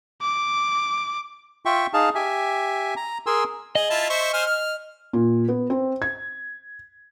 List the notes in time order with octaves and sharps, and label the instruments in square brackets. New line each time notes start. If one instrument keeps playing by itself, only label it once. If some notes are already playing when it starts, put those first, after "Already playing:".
[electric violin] D6
[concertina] F4 E5 G5 C#6
D#4 G#4 F5 A5
G4 E5 G#5
A#5
G#4 A#4 G#5 C6 E6
[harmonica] G#4 [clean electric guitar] D#5
[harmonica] E4 F4 A5
C5 E5 C#6
C5 G#5 F6
F6
[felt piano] A#2
B3
C4
G#6